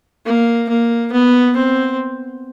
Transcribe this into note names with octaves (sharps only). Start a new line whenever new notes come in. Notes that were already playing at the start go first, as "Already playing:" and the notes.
A#3
A#3
B3
C4